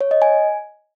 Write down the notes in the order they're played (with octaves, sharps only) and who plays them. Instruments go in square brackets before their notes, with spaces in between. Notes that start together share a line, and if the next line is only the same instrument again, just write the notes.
[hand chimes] C#5
D#5
G#5